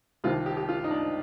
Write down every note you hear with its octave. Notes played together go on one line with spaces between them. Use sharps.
C2 C3 D#3 F4
G4
G4
F4
D#4
D4